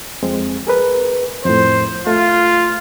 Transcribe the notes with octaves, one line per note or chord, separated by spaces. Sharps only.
F2 G#3 C4
G#4 A#4 B4
F2 A2 C5
A3 F4